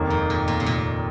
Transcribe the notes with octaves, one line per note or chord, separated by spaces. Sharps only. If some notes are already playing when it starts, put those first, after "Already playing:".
Already playing: F1 D#2 D#3 A#3
G#2
A#2
A#2
C3
A#2